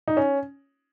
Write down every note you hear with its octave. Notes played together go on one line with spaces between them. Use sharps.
D#4
C#4